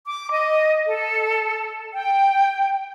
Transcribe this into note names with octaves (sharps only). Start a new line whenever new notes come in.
D6
D#5
A4
G5